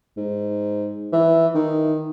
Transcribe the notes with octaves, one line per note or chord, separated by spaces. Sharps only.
G#2
E3
D#3